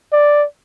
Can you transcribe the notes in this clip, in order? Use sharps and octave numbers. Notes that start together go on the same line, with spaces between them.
D5